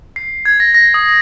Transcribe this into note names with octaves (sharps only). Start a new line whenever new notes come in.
C7
G#6
A#6
A#6
D#6